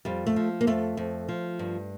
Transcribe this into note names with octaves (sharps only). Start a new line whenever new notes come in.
F2 G3
A3
F3
A#3
F2 A3
F2
F3
G2